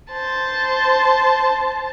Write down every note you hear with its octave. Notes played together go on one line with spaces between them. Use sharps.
C5 A5